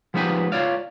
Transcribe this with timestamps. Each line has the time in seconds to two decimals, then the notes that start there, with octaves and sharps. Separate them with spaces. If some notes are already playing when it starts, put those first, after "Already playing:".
0.14 F3 G#3 B3 D#4 G4 B4
0.52 F4 C#5 D5 F5